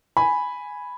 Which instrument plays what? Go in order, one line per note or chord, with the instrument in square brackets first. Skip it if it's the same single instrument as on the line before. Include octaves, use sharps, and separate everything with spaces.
[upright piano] G#5 B5